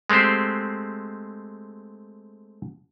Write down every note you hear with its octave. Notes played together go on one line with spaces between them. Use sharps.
G#3 A3 C4 G4 C5